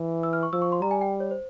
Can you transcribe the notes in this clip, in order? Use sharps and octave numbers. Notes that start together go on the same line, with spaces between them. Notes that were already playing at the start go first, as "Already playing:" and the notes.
Already playing: E3
E6
F6
C#6
F3 E6
C#6
C6
G3 A#5
G#5
G5
C#5
C5